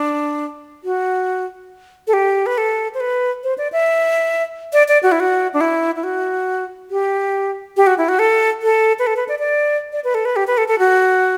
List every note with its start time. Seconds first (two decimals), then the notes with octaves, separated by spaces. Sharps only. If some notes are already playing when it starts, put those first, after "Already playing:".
Already playing: D4
0.84 F#4
2.07 A4
2.13 G4
2.46 B4
2.58 A4
2.94 C5
3.00 B4
3.44 C5
3.58 D5
3.72 E5
4.73 D5
4.88 D5
5.03 F#4
5.12 E4
5.20 F#4
5.54 D4
5.61 E4
5.96 E4
6.04 F#4
6.91 G4
7.77 G4
7.87 F#4
7.98 E4
8.09 F#4
8.19 A4
8.62 A4
8.99 B4
9.07 A4
9.17 B4
9.28 D5
9.39 D5
9.92 D5
10.04 B4
10.15 A4
10.25 B4
10.36 G4
10.47 B4
10.58 A4
10.68 A4
10.79 F#4